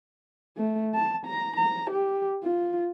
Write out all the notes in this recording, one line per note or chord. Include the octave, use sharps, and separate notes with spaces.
A3
A5
A#5
A#5
G4
F4